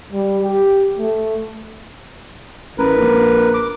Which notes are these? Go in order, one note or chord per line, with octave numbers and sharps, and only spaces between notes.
G3
G4
A3
A1 A#4 B4
A#1
D6